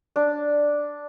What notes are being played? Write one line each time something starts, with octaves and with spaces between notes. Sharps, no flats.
D4